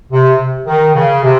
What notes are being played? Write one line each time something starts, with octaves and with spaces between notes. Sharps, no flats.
C3
D#3
C#3
C3